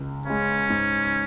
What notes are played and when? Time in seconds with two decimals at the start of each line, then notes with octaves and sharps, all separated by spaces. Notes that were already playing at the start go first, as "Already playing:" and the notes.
Already playing: C#2
0.26 C#3 G#3 C#4
0.69 G#2